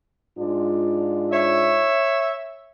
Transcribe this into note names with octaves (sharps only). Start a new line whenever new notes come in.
G#2 D4 F4
C#5 E5